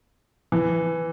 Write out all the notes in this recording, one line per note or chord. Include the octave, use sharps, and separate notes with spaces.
E3